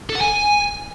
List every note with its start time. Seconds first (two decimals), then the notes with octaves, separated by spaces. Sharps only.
0.10 A4
0.15 F#5
0.21 G#5